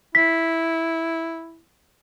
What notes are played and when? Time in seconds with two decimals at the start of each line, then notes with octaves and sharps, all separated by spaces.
0.15 E4 B6